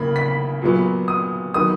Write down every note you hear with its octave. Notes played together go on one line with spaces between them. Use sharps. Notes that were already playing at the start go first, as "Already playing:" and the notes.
Already playing: C#3 E3 A#3 B5
B6
A#2 F#3 B3
D#6
D#3 F#3 B3 D#6